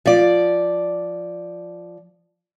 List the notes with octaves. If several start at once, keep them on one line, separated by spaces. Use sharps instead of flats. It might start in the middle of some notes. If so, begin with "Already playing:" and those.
F3 D5